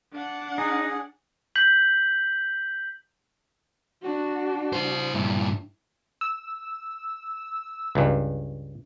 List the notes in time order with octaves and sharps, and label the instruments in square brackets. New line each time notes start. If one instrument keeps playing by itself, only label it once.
[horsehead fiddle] D4 F#5
[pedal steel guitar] D#4 [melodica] G#4
[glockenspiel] G6 B6 F#7
[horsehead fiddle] D4 F#4
[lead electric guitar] E4 C5
[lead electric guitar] G2 A#2 [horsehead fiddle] E4
[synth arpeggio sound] E6
[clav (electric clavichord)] C#2 G2